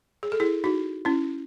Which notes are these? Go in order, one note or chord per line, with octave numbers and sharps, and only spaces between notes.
G#4
A4
E4 G#4
D#4 F#4
C#4 E4